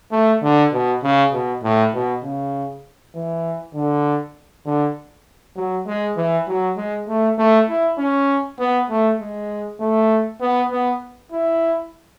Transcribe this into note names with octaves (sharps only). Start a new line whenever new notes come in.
A3
D3
B2
C#3
B2
A2
B2
C#3
E3
D3
D3
F#3
G#3
E3
F#3
G#3
A3
A3
E4
C#4
B3
A3
G#3
A3
B3
B3
E4